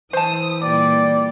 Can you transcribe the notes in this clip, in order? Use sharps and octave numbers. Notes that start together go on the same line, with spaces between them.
E3 C5 A5 D#6
A#2 G3 D5